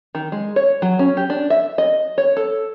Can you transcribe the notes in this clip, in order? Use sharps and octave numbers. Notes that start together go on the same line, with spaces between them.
D#3
G#3
C#5
F#3
C#4
G4
D4
E5
D#5
C#5
A4